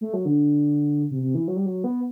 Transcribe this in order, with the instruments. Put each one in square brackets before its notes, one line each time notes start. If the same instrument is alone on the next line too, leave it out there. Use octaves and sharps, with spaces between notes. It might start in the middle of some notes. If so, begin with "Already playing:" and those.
[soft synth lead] A3
F#3
D3
C3
C3
E3
F#3
G3
F#3
B3